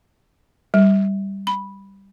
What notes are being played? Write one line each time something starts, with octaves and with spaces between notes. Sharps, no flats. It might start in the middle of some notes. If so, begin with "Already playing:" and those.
G3
B5